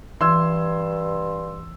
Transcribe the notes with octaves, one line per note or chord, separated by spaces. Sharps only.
G2 E3 C6 E6 G#6